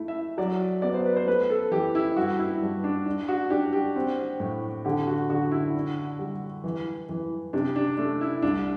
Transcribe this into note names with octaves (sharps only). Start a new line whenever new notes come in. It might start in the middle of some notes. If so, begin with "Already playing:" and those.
Already playing: A3 E4
E5
F#3 D5
B3 D5
C5
B4
C5
A3 B4
A4
E3 G4
E4
G2 F#4
E4
G2
D4
D4
F#4
D4 G4
G4
C4
A2
D3 G4
F#4
D3 F#4
E4
D4
G3
E3
E3
C3 D4
D4
A3 D4
E4
C2 D4